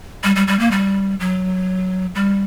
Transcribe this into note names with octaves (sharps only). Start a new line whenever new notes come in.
G3
G3
G3
A#3
G3
F#3
G3